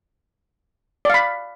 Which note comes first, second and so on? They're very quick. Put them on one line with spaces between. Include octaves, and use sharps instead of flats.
D5 F5 B5